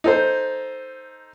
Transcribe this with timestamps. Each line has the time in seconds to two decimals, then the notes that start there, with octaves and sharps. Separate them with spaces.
0.04 D#4 A4 C5